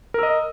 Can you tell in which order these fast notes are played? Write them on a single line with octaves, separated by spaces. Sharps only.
A#4 E6 D#5